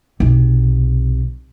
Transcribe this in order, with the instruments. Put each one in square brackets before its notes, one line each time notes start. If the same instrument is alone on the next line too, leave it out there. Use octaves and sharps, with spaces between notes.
[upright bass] B1 C3